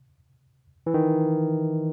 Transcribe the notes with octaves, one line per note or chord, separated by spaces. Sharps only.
E3
D#3